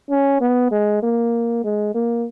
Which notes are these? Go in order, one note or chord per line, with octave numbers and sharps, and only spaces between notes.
C#4
B3
G#3
A#3
G#3
A#3